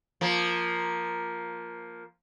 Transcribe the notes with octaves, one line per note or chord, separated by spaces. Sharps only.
F3 A#3